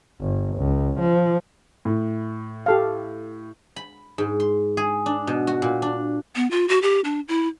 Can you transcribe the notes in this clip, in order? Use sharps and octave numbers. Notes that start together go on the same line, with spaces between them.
G1
C#2
F3
A2
G4 A4 F5
B5
G#2
C6
G#4
D4
B2
F#4
A#2
D4
B3
F4
F#4
G4
D4
E4